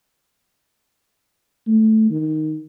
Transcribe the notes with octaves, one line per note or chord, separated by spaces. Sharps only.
A3
D#3